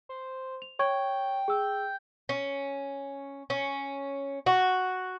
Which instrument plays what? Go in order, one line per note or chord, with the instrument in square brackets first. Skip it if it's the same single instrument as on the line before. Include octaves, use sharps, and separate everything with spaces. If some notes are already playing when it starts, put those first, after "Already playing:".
[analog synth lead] C5
[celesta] F7
[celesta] C#5 C#6 G#6 [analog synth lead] G5
[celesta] G#4 E6
[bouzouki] C#4
C#4
F#4